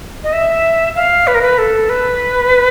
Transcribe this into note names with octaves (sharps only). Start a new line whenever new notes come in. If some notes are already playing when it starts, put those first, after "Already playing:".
D#5
E5
F5
B4
A#4
B4
A4
B4